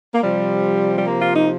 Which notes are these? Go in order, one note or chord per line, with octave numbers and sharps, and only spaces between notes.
A#3
C3 F3 G3
G3
A#3
F4
D#4